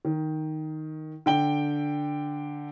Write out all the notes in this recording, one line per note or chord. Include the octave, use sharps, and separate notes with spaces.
D#3
D3 G5 G7